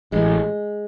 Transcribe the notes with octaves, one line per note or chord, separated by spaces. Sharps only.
A1 G#3